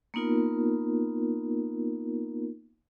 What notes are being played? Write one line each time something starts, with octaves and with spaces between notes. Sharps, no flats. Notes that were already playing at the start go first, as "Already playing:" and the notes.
A#3 B3 D#4 F4 A#4